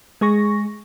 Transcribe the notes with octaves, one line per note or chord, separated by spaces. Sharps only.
G#3 G#4 C#6 A#6